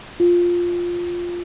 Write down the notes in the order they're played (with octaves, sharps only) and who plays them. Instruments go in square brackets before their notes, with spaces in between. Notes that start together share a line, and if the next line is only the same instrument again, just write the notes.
[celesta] F4